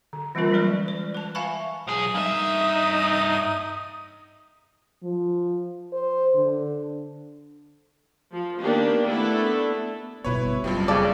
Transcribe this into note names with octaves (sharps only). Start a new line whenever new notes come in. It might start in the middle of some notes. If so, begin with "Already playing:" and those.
D3
E3 G3 A#3 C#4 F4 A#4
E3 F#3 G#3 B4 D5
D5
B4 A5
E5 F5 G#5 A5 B5 C#6
B1 G#4 D#6
G2 D#4 E5
F3
C5
D3
F3
D#3 A#3 B3 D4 G4
A3 B3 D4 E4 A4
G1 B2 B3 E4 B4 C#5
F#1 F2 F3 G3
C#3 A4 D5